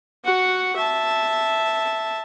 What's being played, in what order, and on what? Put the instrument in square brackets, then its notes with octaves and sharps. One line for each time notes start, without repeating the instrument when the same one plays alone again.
[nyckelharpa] F#4 F#5
E5 A5